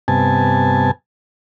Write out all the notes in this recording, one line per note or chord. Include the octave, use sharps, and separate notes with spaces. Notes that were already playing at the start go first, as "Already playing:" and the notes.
G2 C3 B3 G#5 A5